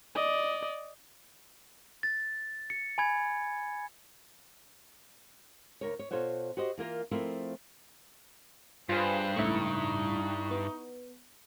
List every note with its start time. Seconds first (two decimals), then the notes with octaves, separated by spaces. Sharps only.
0.15 D5 D#5
2.03 A6
2.70 C#7
2.98 G#5 B5 G#6
5.81 D2 A#4 C#5
5.99 C#5
6.11 B2 F4 A4 C5 C#5 F#5
6.57 F#4 G4 C5 D#5
6.78 E3 A#3 F4 A#4
7.11 F3 A3 C4 E4 F4 A#4
8.89 G2 F4 G#4 B4 C5
9.36 C#2 A2 D#4 E4 C#6
10.51 B3